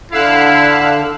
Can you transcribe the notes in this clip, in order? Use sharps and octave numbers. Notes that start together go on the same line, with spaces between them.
D3 E4 F5 E6 F#6